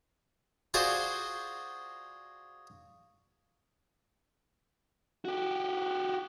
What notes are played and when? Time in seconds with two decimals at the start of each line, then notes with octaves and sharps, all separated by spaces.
0.74 F4 F#4 G#4 C5 D5
5.25 F#4 G4